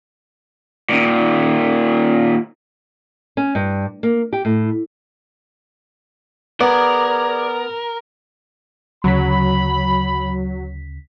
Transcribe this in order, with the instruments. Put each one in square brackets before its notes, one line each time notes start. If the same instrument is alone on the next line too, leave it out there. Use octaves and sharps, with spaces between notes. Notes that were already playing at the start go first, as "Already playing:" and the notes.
[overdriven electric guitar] A#2 D#3
[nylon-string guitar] C#4
G2
A#3
G4
A2
[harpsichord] B3 [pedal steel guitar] G#4 D5 [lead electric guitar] A#4 [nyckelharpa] A#5
[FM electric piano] D2 C#3 B6 [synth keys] F#3 [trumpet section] B5